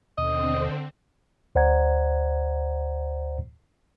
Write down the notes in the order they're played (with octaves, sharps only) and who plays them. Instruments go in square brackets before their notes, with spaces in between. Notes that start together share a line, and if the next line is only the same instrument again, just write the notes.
[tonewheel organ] D#2 B2 [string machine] D3 C4 [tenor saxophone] D#5
[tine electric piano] D2 C5 D5 F#5 A#5 G#6